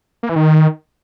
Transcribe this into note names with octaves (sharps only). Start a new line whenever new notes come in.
A#3
E3
D#3